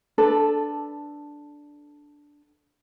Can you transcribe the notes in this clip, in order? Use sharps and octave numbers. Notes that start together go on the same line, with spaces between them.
D4 A4 B4